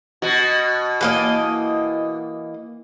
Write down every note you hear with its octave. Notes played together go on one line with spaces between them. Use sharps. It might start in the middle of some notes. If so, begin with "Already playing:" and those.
B2 F#4
E3 A#3 D#5